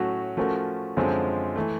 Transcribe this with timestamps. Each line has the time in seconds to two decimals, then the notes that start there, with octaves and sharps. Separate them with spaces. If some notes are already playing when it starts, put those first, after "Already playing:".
Already playing: A2 F#3 A3 C#4 F#4
0.37 F3 A3 C#4 F#4 A#4
0.97 F#2 D3 F3 G#3 C4
1.56 E3 A3